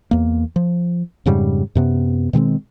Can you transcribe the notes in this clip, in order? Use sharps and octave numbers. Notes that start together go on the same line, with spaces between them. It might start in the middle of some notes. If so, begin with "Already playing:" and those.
E2 A#3
F3
F2 G#2 C#3 G3
F#2 C3 B3
B2 D#3 G#3 C4